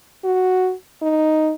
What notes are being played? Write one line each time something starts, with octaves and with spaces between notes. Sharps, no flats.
F#4
D#4